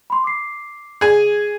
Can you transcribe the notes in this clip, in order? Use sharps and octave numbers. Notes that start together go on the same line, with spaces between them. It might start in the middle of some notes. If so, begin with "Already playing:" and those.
B5 C6
D6 C7
G#4 G#5